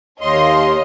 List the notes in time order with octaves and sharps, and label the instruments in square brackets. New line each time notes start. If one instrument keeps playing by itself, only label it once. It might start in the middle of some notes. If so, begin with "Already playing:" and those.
[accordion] D#2 C6 [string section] C#5 D#5 F5